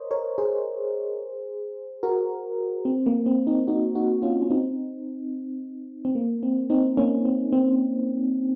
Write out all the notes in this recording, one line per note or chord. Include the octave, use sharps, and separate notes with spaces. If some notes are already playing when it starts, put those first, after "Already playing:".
Already playing: A#4 C5 C#5 D#5
A#4 C#5
G#4 C5
F#4 A#4
C4
A#3
C4
C4 D#4
D#4 F#4
D#4 F#4
C#4 F4
C#4
C4 D#4
C4
A#3
C4
C4 D#4
A#3 C#4
C4
C4